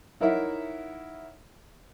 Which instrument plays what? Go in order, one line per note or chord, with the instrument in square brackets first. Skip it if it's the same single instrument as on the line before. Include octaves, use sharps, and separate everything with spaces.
[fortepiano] D#4 E4 A#4 C#5 E5 F#5